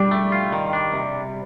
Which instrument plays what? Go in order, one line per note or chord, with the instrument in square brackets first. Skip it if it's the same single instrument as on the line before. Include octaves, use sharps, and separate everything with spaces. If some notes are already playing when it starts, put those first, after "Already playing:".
Already playing: [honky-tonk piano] G3 [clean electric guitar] D4
[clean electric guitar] A3
F4
D#3
D4
C3